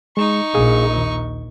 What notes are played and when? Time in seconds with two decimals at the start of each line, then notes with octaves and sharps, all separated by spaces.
0.17 G#3 D#4 C#6
0.55 A#1 G#4 F5 D#6
0.97 D#2